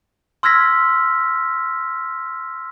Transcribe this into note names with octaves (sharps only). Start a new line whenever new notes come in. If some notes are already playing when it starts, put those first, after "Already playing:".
C6 E6 F6 G#6 A#6 B6